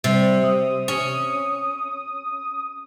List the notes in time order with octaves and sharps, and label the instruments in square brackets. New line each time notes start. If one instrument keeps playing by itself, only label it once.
[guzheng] C3 [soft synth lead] G3
[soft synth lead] D#6
[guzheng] C#4